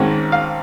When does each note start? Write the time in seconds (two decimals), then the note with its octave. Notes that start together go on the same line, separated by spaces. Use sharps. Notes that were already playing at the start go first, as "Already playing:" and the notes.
Already playing: G#1 G#2 D#3 G#3 C#4
0.32 F5